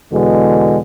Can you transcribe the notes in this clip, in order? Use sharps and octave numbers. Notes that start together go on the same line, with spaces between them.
E2 B2 D3 G#3